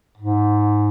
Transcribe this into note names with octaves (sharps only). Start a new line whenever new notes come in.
G#2